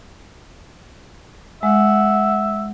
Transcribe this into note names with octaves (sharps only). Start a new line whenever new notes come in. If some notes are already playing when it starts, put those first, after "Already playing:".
G#3 E5 F#5